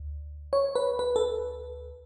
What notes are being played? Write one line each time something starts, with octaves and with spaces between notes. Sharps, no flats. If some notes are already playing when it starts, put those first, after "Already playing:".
Already playing: D2
C#5
B4
B4
A4